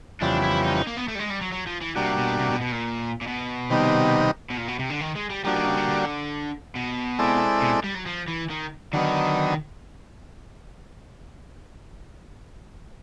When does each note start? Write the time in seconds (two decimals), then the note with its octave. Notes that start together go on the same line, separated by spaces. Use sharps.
0.21 F2 C#3 E3 G3 B3 D4
0.44 E4
0.64 D#4
0.76 D#4
0.87 A#3
0.97 B3
1.08 A3
1.15 G3
1.19 G#3
1.30 G3
1.41 F#3
1.52 F#3
1.66 F3
1.81 E3
1.95 C3 G3 A#3 D4 F#4
2.17 B2
2.39 C3
2.50 B2
2.61 B2
2.72 A#2
3.21 A#2
3.27 B2
3.70 C3 D#3 G3 B3 D#4
4.50 B2
4.58 A#2
4.68 B2
4.79 C3
4.90 D3
5.01 D#3
5.15 G#3
5.30 G3
5.44 F3 G3 A#3 D4 F#4
5.56 D#3
5.66 C#3
5.77 D3
5.88 D3
6.76 B2
7.19 G#3 C4 E4 A4 D5
7.62 B2
7.84 G3
7.95 F#3
8.06 F3
8.28 E3
8.50 D#3
8.93 D3 D#3 F#3 B3 D#4